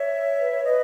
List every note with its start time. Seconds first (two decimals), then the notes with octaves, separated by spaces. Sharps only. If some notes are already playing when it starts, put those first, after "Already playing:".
Already playing: C#5 E5
0.39 B4
0.52 C#5
0.64 B4 D#5